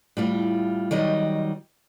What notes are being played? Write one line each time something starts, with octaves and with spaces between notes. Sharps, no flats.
A2 G3 F4
D#3 F#3 G3 D#5